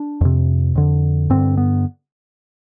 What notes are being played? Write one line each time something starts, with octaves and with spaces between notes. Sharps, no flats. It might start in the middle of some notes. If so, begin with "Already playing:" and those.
Already playing: D4
F2 C3
F2 D3
G2 D3 C4
B3